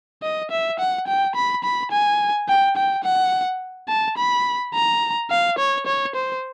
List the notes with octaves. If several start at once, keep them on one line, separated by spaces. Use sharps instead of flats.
D#5
E5
F#5
G5
B5
B5
G#5
G5
G5
F#5
A5
B5
A#5
F5
C#5
C#5
C5